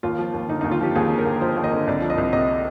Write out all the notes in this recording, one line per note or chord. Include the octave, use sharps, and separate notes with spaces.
D#2 F4
F3
D#2
D3 D#4
D#2 D#4
F4
F3 G4
D#2 G#4
D3
A#4
D#2
F3 C5
D#2
D#5
D3
C2 D5
F3
D#5
C2
C3 D#5